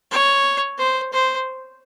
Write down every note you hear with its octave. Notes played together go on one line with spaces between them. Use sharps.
C#5
C5
C5